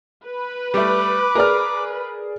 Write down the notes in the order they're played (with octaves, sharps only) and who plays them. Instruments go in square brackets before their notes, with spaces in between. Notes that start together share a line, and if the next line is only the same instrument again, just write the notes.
[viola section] B4
[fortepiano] G3 A3 [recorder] D6
[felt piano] G#4 D5 F6 [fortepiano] A#4